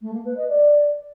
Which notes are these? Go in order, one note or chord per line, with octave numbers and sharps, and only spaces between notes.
A3
A#3
B4
D#5
D5